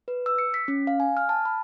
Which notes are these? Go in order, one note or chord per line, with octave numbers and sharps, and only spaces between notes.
B4
E6
C#7
B6
C#4
F5
G#5
F6
A5
B5